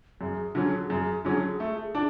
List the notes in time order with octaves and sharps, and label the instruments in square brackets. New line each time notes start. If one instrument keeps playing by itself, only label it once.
[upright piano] F#2 [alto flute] G#4
[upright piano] D3 F#3 C#4
F#2
D3 F#3 C#4
A3
D4